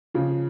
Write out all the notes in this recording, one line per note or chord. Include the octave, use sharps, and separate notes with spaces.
C#3 F3